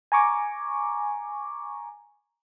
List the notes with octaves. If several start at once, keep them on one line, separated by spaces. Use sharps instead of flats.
G#5 A#5 C#6 D6